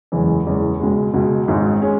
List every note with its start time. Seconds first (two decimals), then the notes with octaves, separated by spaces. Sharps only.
0.12 F#1 E2 E3 G#3 C#4
0.46 F#1 E2 E3 G#3 C#4
0.80 C#2 B2 G#3
1.14 C#2 B2 G#3
1.48 G#1 G#2 G#3 C#4
1.82 G#3 C#4